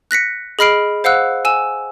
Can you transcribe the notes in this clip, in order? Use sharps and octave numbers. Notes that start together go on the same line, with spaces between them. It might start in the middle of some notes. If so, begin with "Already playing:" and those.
F#6 A#6 B6 C#7
G#4 D#5 B5 F6 C7 D7
C5 F5 F#5 E6 F#6
G#5 E6 E7